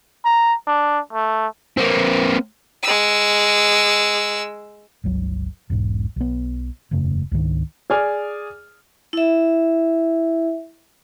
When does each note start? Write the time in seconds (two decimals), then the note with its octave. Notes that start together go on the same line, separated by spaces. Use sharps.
0.25 A#5
0.67 D4
1.13 A3
1.77 A#3 C4
2.82 G#3 E6
5.04 G1 C#2 F#3
5.70 E1 B1 G#2
6.16 B1 B3
6.91 E1 F#2 C#3 A3
7.31 C#2 G#2 D#3 D4
7.90 G#4 D5 G#5 F6
9.13 E4 E5